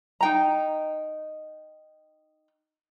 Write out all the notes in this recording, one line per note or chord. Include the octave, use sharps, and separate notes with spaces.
D#4 G5 A#5